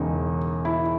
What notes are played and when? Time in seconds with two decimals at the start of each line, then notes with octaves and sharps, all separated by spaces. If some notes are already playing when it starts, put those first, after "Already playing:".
Already playing: E1 E2 C#3 D#4
0.65 E4